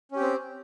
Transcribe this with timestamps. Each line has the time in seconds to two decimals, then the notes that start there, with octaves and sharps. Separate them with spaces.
0.12 C#4
0.16 G4
0.20 C4